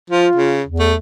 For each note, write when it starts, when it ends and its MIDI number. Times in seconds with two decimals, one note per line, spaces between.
0.10 0.28 53
0.10 0.60 65
0.36 0.63 49
0.66 0.96 40
0.79 0.95 57